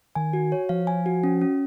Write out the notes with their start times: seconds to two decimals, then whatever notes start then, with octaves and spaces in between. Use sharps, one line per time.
0.15 D#3 G#5
0.33 F#4
0.52 C#5
0.69 F3 F5
0.87 G#5
1.06 F#4
1.24 C#4
1.41 C#4